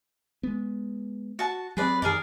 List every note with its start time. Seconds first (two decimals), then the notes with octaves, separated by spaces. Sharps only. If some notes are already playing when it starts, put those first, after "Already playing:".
0.43 G#3 B3
1.39 F#4 A5
1.77 F#3 C4 G#4 B4 D5
2.02 F#2 D#3 G#4 A#4 D5